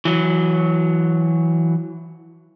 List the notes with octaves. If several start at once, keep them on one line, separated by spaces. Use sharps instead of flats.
E3 F#3